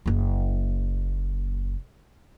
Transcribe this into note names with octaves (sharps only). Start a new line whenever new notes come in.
F#1 A#3